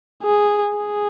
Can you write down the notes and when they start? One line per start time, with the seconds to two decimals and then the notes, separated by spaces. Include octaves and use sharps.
0.23 G#4
0.77 G#4